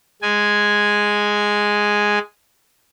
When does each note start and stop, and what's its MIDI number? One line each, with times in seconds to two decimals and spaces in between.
0.22 2.19 56
0.22 2.19 80